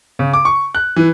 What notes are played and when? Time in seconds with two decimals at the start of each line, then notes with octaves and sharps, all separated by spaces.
0.19 C#3
0.33 D6
0.45 C#6
0.75 F#6
0.96 E3